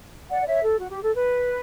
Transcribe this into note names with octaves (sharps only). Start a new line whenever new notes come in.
D5 F#5
D5
C#5 E5
A4
F#4
G4
A4
B4